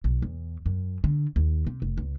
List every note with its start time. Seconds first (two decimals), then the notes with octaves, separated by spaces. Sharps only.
0.04 B1
0.22 E2
0.66 F#2
1.04 D3
1.36 D#2
1.67 C3
1.82 F1
1.98 C#2